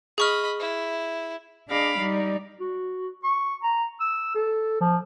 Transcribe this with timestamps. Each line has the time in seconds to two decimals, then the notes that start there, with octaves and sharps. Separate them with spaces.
0.18 G#4 D#5 B5 C#6 F6
0.60 E4
1.66 D4 G#4 D#5 F5 B5 D6
1.97 G3 D#4 D5
2.60 F#4
3.24 C#6
3.63 A#5
4.00 E6
4.35 A4
4.81 F3